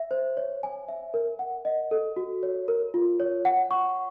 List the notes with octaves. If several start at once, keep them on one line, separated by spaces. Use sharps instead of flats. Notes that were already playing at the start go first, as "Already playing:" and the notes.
Already playing: E5
C5
C#5
G#5
E5
A#4
F#5
D#5
A4
F#4
C#5
A#4
F4
C#5
F#5
C#6